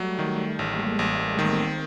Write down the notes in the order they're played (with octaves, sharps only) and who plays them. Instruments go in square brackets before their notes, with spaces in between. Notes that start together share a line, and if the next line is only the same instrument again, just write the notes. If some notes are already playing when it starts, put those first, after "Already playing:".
Already playing: [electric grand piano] F#3 [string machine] G3 A3
[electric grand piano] D#3
[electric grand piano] A1 [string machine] G#3 A#3
[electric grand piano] A1
[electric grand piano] D#3 [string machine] A#3 C4